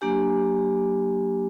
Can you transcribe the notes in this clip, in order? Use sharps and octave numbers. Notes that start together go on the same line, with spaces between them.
F#3 A#3 D4 G4 G#5